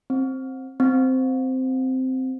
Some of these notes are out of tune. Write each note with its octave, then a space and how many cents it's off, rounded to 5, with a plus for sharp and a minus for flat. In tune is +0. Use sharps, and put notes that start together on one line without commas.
C4 +10
C4 -10